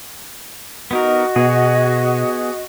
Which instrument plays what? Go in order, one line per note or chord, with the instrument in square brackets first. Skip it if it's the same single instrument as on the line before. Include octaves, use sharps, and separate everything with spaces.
[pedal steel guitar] B3 D#4 A#4 [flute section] F#4 D#5
[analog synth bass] B2 [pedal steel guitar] B3 G#4